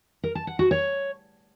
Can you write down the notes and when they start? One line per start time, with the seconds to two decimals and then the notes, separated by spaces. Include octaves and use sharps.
0.24 A#4
0.35 A5
0.47 F#5
0.59 F#4
0.71 C#5